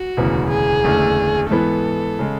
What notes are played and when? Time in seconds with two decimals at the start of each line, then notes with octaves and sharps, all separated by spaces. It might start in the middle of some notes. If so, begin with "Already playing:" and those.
Already playing: F#4
0.17 E1 D2 C#3 E3 B3
0.50 G#4
0.84 F#1 E2 D3 A3
1.50 G#2 E3 B3 A4
2.19 C#3 G#3